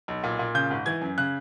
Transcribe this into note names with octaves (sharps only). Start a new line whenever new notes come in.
B1
A#2
A#2
C#3 G6
G#1
E3 G#6
F#2
C#3 F#6